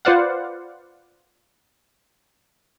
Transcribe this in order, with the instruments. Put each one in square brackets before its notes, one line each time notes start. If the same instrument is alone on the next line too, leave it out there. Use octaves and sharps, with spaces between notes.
[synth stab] F4 B4 C5 D5 F5 F#5